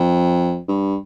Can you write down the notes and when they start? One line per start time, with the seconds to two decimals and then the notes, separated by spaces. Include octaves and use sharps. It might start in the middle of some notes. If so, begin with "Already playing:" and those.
Already playing: F2
0.68 G2